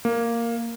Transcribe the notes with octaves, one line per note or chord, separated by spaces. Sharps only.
A#3